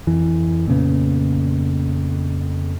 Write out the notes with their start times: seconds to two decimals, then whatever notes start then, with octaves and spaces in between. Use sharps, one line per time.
0.07 F2 E3
0.68 A#2 C#3 B3